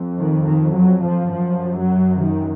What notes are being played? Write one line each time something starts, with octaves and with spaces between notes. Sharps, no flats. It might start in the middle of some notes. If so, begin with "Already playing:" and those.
Already playing: F2
D#3
D#3
F#3
F3
F#2 F3
F#3
D#3